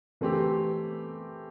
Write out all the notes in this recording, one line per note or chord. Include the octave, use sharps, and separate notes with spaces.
E3 A3 C4 G4